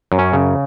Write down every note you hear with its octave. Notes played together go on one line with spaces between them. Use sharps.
F#2
C#4
C#3